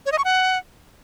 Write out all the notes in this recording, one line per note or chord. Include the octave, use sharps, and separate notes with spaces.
C#5
D#5
C#6
F#5